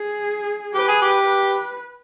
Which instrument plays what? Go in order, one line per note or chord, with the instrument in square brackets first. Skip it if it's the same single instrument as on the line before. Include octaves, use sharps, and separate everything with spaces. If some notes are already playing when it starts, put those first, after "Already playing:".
Already playing: [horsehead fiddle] G#4
[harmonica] G4 [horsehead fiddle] B4
[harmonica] G#4
G4
[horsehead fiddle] B4